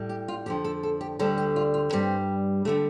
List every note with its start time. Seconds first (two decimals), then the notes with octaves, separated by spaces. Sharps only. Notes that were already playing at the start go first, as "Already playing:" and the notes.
Already playing: A2 G3
0.09 G4
0.28 F4
0.46 F2 D3 F3 G4
0.64 A4
0.83 A4
1.01 G4
1.19 D2 D3 G3 A4
1.38 G4
1.56 F4
1.74 F4
1.93 G2 G3 C4
2.65 D3 G3 A3